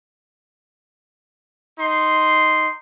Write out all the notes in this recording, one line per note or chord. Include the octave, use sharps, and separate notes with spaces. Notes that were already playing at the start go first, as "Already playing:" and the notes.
D#4 C6